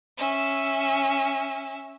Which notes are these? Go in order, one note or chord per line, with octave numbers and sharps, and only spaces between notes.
C#4 E5